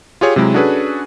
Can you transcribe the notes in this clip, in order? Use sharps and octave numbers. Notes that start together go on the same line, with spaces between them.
F4 G4 G#4 C#5 F5
C3 F#3 G#3 E4
C#4 D4 F#4 G#4 A4 B4